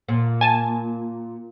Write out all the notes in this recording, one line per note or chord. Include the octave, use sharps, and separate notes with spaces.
A#2
G#5 A5